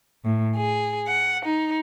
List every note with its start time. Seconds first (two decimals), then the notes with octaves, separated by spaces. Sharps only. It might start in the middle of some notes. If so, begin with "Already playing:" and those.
0.24 A2
0.55 G#4
1.08 F#5
1.44 D#4